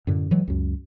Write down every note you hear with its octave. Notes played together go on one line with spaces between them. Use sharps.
F#2 A2 D3
E3 F#3 G#3
C#2 F#2